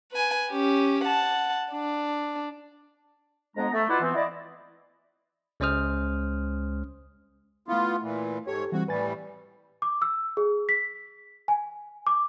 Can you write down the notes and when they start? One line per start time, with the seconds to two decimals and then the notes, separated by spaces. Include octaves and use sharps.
0.12 B4 G#5
0.50 C#4 G4
1.04 F#5 A5
1.72 D4
3.57 F2 G#3 B3 D4 A#5
3.74 A3
3.89 B2 E4 F4 B4 D5 F#5
4.01 E3 B3 C4
4.15 E4 D5 D#5
5.60 C#2 G#3 C#4 C5 D#6 F6
7.68 A3 B3 E4 F4
8.02 A#2 E3
8.47 G#2 G4 A4 C#5
8.72 E3 G3 C4 F#4
8.88 A2 E3 G3 B4 G#5 A6
9.82 D6
10.02 E6
10.37 G#4
10.69 B6
11.48 G#5
12.07 D6